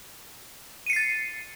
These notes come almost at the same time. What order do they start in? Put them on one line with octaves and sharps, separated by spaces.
D#7 C#7 C7 A6